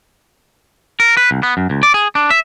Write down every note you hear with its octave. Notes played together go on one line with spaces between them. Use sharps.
A#4
B4
C2
B3
F#2
C#2
D5
G#4
D4
E5